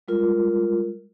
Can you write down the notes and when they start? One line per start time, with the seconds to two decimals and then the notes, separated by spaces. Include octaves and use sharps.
0.08 G3 G#3 F4 A#4